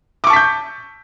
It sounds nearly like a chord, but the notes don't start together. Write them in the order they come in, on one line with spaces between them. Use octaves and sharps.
D6 C#6 A5 B6 G6